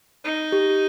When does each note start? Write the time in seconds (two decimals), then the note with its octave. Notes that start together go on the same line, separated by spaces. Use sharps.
0.24 D#4
0.52 G4